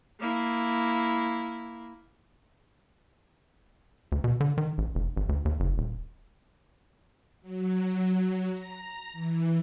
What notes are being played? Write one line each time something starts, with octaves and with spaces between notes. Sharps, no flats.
A#3 E4
D2
B2
D3
D#3
A1
F1
G#1
D2
D#2
F#1
D#1
F#3
A#5
E3